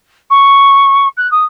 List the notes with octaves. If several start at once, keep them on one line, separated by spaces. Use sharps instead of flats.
C#6
F#6
D#6